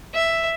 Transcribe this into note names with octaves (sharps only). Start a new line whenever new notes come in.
E5